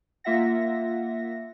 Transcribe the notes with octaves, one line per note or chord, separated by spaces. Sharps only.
A#3 F4 E5 F#5 A#6